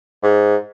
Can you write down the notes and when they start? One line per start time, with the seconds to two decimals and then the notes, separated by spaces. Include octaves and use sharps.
0.23 G#2